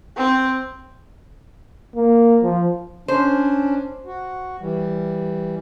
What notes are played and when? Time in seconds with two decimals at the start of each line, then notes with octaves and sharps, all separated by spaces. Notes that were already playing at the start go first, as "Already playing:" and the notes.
0.17 C4
1.96 A#3
2.43 F3
3.08 C#4 D4 C5
4.06 F#4
4.60 E3 G3